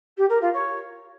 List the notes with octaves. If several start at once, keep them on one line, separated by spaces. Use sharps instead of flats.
G4
A#4
F4
C#5